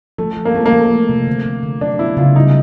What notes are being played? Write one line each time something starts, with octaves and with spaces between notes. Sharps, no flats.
F3 A3
F3
A#3
A3 C4
A#3
F3
A3
C3
D3
D3
D3
F#3 D4
B3 E4
C#3 F4
G3 D#4